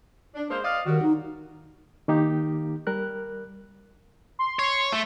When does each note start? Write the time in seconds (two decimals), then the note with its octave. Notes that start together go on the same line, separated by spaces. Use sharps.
0.35 D4
0.50 G#3 A#3 C5
0.64 D5 D#5 F5
0.86 D#3 F#3 G3 F#4
1.02 D#4
2.08 D#3 A#3 D#4 G4
2.87 G3 A#4 F#6
4.39 C6
4.59 C#5
4.92 A3